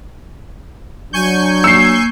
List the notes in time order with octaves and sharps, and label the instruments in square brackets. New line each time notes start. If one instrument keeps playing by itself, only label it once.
[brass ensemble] F#3 D4 [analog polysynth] G#5 C#6 G6
[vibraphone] A#3 [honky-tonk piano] E6 C7